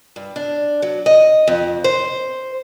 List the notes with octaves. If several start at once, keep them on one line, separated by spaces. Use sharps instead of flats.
G2
D4
F#3
D#5
F2
C5